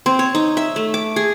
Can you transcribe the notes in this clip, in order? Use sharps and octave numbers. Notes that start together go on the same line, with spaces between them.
C4
C#5
D#4
E5
A3
D6
G#4